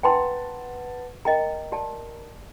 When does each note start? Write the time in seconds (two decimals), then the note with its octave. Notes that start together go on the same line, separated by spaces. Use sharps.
0.03 B4 F#5 G5 A5 A#5 C6
1.25 A#4 D#5 G5 A#5
1.72 G4 D5 A5